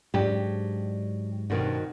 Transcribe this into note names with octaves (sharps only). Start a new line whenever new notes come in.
G#2 F#3 D4 G4
G2 B2 D#3 C4 F#4